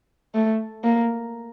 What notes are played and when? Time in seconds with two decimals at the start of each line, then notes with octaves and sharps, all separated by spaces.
0.35 A3
0.84 A#3